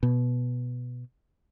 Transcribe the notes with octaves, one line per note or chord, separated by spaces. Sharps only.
B2